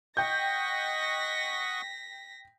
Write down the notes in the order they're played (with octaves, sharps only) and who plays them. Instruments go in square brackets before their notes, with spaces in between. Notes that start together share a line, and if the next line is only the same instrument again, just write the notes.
[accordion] D#5 F#5 C#6 [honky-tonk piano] G5 G6 [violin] A#6 B6